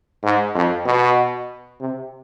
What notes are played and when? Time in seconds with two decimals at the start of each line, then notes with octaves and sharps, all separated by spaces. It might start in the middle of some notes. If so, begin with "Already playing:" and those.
0.24 G#2
0.55 F2
0.86 B2
1.80 C3